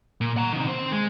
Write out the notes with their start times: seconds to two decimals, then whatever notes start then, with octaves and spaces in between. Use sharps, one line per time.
0.21 A#2
0.37 F#5 A#5
0.53 C3 D#3
0.67 C4 C5
0.92 G#3